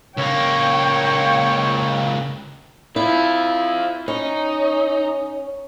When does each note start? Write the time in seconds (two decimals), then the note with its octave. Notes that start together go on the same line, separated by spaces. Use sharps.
0.17 C#2 A#3 C#5 G5
2.96 C4 E4 F4
4.08 C#4 D#4